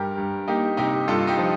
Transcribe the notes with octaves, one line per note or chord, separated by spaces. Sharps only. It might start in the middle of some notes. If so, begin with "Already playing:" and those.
Already playing: G2 G4 A#4
G2
A#3 D#4 G4
C3 D#4 G4
G2 F4 A4
D#4 G4
F3